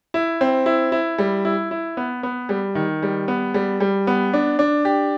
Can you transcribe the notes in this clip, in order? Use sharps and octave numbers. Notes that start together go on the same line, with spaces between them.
E4
C4
E4
E4
G3
E4
E4
B3
B3
G3
D#3
G3
B3
G3
G3
B3
D4
D4
G4